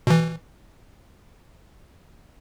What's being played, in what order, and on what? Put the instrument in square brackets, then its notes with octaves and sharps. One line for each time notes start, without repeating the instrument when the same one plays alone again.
[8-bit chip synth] B2 E3